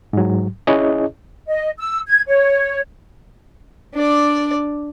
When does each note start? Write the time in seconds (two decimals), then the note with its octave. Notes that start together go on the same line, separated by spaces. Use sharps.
0.13 G#2 F#3
0.67 C#4 E4 G#4 C#5 D#5
1.48 D#5
1.78 E6
2.07 G#6
2.27 C#5
3.94 D4 D5